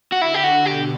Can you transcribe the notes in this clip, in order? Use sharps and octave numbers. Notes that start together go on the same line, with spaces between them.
F#4
D3 E4
G4
F#4
B2 G4